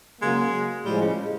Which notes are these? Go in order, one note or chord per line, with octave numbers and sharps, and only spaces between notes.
C#3 F#3 G#3 A#3
A2 F3 G3 G#3
C#3